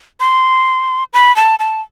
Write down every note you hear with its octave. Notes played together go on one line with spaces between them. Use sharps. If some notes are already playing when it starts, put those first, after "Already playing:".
C6
B5
A5
A5